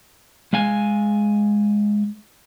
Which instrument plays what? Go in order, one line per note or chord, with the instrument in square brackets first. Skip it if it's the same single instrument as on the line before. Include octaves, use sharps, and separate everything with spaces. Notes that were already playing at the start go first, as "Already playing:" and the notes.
[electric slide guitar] G#3 F5 G#5